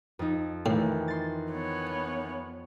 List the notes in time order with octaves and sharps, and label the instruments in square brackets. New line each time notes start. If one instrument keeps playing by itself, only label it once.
[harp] F2 D#4
[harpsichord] A2 [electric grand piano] D#3 E3
[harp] C6 A6
[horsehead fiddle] B3 C#5